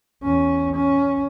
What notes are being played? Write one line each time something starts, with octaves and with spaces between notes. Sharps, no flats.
E2 C#4
C#4